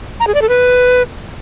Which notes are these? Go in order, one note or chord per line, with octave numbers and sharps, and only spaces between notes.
A#5
G#4
D5
A4
B4